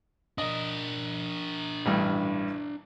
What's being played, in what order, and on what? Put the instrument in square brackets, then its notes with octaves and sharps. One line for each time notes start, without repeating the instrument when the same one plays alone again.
[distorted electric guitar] D4 A#4 [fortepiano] D#5
[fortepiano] A1 G2